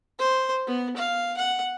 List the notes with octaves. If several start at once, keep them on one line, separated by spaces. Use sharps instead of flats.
C5
B3
F5
F#5